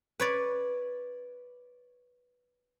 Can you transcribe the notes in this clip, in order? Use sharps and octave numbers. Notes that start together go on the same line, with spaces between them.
B4 C#5 D5